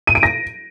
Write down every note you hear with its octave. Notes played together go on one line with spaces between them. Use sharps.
D#7
D7
A#6